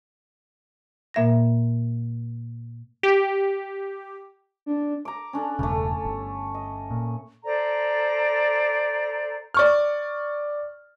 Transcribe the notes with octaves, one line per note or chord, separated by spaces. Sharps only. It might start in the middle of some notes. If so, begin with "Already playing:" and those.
A#2 A#3 E5 G#6 A#6
G4
D4
A#5 D6
C#4 D4 A4
E1 G2 C#3 A3 C#4
G1
D#5
A#2
A4 C5 D5 A#5
D5 C#6 F6